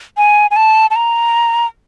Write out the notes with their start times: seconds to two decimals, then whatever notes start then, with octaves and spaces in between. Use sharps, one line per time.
0.17 G#5
0.51 G#5
0.56 A5
0.90 A5
0.96 A#5